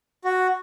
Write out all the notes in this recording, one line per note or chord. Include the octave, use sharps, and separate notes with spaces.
F#4